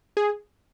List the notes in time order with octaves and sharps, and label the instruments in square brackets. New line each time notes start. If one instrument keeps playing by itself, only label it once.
[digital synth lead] G#4